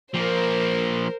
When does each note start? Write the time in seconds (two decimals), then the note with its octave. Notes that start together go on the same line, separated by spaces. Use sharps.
0.14 F3 A#3 A#4 C5